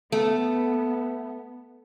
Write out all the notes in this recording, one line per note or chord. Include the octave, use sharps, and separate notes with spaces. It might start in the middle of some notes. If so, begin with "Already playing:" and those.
A3 B3